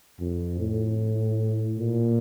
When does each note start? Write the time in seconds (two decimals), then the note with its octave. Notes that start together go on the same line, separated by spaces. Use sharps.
0.20 F2
0.60 A2
1.79 A#2